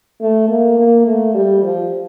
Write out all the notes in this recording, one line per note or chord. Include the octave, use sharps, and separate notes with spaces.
A3
A#3
A#3
A3
G3
F3